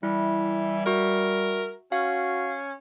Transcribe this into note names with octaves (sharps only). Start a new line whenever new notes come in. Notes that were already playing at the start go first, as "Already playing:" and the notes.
E3 G3 E4
F#4 A#4 E5
C#4 F#4 F5